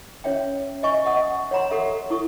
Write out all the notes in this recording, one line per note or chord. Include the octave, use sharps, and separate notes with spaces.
C#4 C#5 E5 G5
D#5 E5 G#5 C#6
D#5 E5 F#5 D#6
C#5 F#5 A#5 C6
F#4 G4 A4 E5
E4 A4 C#6 D#6